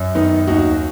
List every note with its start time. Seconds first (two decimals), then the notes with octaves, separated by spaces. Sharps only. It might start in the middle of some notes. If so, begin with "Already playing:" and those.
Already playing: F#2
0.15 D#3 B3 D#4
0.47 D#2 D#4 F#4